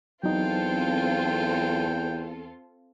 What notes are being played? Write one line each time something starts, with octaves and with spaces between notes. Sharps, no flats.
E2 F#3 C4 D#4 F4 A4 G5